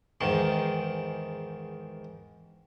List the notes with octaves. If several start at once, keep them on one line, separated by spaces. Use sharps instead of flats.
E2 G#2 D#3